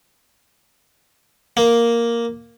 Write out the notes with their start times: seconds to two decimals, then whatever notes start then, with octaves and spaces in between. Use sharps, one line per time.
1.57 A#3